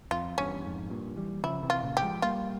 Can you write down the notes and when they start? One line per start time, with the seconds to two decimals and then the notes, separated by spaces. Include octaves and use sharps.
0.11 F2 F4
0.38 E2 G2 C#4
0.64 F2 G#2
0.90 G2 A#2
1.16 E3 G3
1.43 C#3 F3 E4
1.63 C3 E3
1.70 F4
1.83 A#2 C#3
1.97 G4
2.02 F3 G#3
2.22 G3 A#3 F4